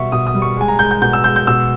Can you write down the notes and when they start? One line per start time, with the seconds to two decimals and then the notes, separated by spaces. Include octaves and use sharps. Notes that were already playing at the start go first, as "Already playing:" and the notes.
Already playing: B2 G3 E5 C#6
0.12 B2 D#6
0.27 D#6
0.34 G3
0.42 C#6
0.57 G#3 G#5
0.68 A#5
0.79 G#3 G6
0.91 G6
1.02 B2 G6
1.13 E6
1.24 G#3 G6
1.36 G6
1.47 B2 E6